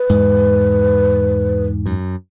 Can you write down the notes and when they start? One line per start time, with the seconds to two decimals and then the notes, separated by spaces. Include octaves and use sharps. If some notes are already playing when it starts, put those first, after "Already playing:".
Already playing: B4
0.09 E2 G#2
1.86 F#2